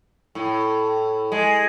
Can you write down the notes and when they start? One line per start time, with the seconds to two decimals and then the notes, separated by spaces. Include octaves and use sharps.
0.35 A2
1.32 G#3